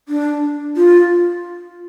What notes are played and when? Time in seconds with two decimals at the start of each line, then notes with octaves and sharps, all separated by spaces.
0.09 D4
0.77 F4